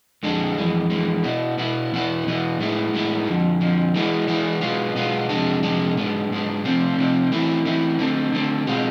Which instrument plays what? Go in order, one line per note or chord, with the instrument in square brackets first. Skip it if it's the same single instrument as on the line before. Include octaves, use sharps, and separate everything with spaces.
[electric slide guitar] F2 D3 G#3 D4
F2 E3 G#3
F2 E3 G#3
B2 B3 E4
B2 B3 E4
E2 B2 B3 E4
E2 B2 B3 E4
A2 G#3 B3 E4
A2 G#3 B3 E4
F2 D3 F3
F2 D3 F3
E3 G#3 B3 E4
E3 G#3 B3 E4
B2 G#3 B3 F4
B2 G#3 B3 F4
F2 C3 G#3 D4
F2 C3 G#3 D4
G#2 G#3 B3 D4
G#2 G#3 B3 D4
C3 F3 A3 C4
C3 F3 A3 C4
E3 A3 C4 E4
E3 A3 C4 E4
D3 A3 C4
D3 A3 C4
B2 G#3 C4 F4